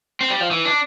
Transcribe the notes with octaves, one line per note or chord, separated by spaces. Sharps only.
C4
G3
F3
E3
D4